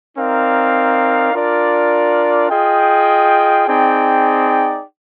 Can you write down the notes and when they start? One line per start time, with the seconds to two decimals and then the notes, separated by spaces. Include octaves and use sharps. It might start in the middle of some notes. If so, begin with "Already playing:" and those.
0.17 C4 D#4 A#4 D5 F5
1.33 D4 F4 A#4 D5
2.50 F4 G#4 D#5 G5
3.68 C4 D#4 G#4 D5 G5